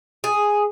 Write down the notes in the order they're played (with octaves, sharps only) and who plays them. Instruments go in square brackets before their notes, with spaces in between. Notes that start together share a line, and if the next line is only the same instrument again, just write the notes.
[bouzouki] G#4